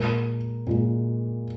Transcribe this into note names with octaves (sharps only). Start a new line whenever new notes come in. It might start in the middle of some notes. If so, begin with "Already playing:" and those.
Already playing: A#2 G#3 A#4
A#2 G#3